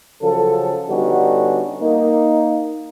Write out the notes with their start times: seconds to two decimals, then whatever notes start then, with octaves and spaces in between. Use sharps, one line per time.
0.22 C#3 F3 F#3 A4
0.89 D3 G3 B3 C#4 D#4 F#4
1.82 A#3 D#4